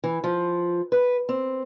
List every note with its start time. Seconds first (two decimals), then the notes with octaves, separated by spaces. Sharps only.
0.04 E3
0.24 F3
0.92 B4
1.29 C4